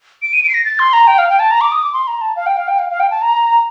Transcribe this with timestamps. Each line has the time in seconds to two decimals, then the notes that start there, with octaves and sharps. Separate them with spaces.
0.22 D7
0.33 D#7
0.44 D7
0.49 C7
0.54 A#6
0.65 A6
0.79 C6
0.93 A#5
1.07 G5
1.18 F5
1.29 G5
1.39 A5
1.51 A#5
1.61 D6
1.72 D#6
1.83 D6
1.93 C6
2.07 A#5
2.21 A5
2.36 F5
2.46 G5
2.57 F5
2.68 G5
2.79 F5
2.90 F5
3.00 G5
3.11 A5
3.21 A#5